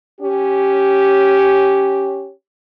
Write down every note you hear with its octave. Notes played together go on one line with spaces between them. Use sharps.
C#4 G4